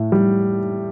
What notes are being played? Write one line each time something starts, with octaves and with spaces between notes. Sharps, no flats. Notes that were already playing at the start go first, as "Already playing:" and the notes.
Already playing: A2
G3